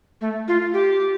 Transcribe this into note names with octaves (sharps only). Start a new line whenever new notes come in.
A3
F4
G4